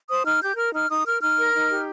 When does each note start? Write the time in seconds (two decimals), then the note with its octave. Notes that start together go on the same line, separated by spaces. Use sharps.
0.09 C5 D#6
0.25 D#4 F6
0.41 G4 G6
0.57 A#4 F6
0.74 D#4 F6
0.89 D#4 D#6
1.06 A#4 F6
1.22 D#4 F6
1.38 A#4
1.54 D#4
1.70 G4